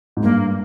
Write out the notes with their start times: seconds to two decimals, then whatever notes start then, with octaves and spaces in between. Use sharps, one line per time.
0.17 G#2
0.23 G2 A#3